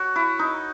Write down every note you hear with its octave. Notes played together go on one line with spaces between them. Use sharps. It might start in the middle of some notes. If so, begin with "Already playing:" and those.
Already playing: F#4 C#5
E4
D#4